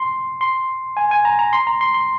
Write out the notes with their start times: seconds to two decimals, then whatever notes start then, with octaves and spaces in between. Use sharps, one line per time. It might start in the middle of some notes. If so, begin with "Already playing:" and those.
Already playing: C6
0.41 C6
0.97 G#5
1.11 G#5
1.25 A#5
1.39 A#5
1.53 C6
1.67 A#5
1.81 C6
1.94 C6